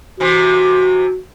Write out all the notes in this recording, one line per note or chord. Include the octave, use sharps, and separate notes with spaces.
C3 E3 F#4